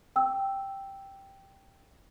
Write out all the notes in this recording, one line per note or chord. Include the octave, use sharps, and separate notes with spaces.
G5 E6